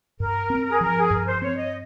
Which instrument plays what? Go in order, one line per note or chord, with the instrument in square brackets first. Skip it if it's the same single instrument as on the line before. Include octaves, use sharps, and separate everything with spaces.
[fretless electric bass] G2 [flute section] A#4
[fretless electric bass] C4
[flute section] G#4
[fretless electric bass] F3 [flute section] A#4
[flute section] G#4
[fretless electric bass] G2 [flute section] A#4
[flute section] C5
[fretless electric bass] C4 [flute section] C#5
[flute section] D#5